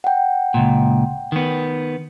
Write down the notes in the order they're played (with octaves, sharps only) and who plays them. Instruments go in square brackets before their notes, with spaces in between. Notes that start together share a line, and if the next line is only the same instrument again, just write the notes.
[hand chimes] F#5 G5
[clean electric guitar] C#2 A#2
D#3 B3